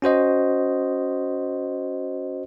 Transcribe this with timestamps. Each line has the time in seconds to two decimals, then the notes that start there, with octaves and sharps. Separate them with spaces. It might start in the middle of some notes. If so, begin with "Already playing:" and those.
0.02 C#4 F#4 C5 D#5